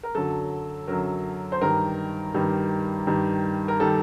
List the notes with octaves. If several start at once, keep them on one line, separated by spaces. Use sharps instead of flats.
A#4
F#2 D3 F#3 A4
F#2 D3 F#3 A#4
C5
G2 D#3 G3 A#4
G2 D#3 G3
G2 D#3 G3
A#4
D#3 G3 A4